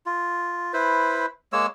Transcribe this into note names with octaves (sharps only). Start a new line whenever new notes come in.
F4
E4 B4 C5
G#3 A#3 C#5 E6